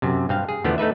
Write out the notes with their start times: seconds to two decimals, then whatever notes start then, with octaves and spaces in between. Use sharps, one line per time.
0.02 F#2 C3
0.29 G2 C4 F5
0.49 G#4
0.64 E2 D3 F3 A3 B3 D5
0.78 A3 D#4 B4 E5